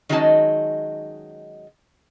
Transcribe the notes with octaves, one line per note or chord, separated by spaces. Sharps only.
D#3 F#3 G#3 C#4 D#4 A5